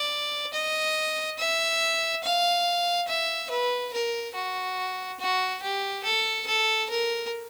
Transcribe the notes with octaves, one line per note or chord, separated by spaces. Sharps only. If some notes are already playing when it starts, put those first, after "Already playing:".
Already playing: D5
D#5
E5
F5
E5
B4
A#4
F#4
F#4
G4
A4
A4
A#4